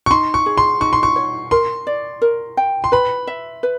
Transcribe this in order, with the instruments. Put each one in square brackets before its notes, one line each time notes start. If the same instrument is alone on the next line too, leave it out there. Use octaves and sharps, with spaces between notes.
[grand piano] C#6
[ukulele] D#4 [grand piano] C6
[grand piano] C#6
[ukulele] G#4
[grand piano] C6
[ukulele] D#4 [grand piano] C#6
[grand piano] C6
C#6
[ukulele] C#5
[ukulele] A#4 [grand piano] C6
[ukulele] D5
A#4
G5
[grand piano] C6
[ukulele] B4 [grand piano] B5
[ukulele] E5
B4